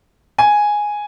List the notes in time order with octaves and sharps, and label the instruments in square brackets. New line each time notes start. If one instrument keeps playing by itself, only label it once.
[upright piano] G#5